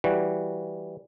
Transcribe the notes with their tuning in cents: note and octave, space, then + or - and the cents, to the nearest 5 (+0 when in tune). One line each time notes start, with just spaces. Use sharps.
E3 +0 G3 -5 F#4 +0